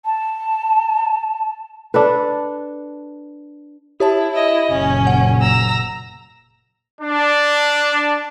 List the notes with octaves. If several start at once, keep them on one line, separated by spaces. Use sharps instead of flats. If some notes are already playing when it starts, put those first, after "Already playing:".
A5
D4 A4 B4
E4 G4 C#5 A5
E4 D#5
F#1 A#2 C#4
F#5
A#5 E6
D4